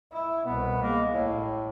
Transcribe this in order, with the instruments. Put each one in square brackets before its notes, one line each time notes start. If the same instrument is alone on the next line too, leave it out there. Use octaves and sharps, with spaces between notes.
[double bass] E4
[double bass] C2 B2 [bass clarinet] B3
[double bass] G#3 [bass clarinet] A#3
[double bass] A1 [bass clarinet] A2